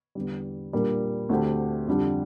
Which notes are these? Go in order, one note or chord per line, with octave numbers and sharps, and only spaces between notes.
E2 D3 G3
A#2 G3 A#3 D4
D2 D3 A3 C4 G4
F2 D3 G3 D4 G4